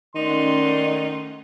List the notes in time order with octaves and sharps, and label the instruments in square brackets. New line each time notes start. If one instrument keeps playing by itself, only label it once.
[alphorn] D#3 [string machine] A3 C#4 F#5 [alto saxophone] D#4 [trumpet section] D5 C6